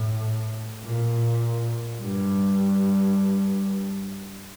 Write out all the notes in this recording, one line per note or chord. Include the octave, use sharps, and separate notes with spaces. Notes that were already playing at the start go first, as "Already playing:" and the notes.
Already playing: A2
A#2
G2